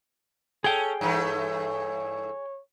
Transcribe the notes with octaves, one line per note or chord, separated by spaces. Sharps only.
C#4 G#4 A4 G5
G2 E3 A3 C#5